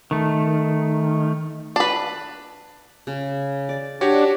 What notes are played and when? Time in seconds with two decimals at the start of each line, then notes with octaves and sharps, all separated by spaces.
0.11 D#3 A3
1.76 D4 B4
3.07 C#3
3.69 D5
4.01 D4 F#4 G4 C#5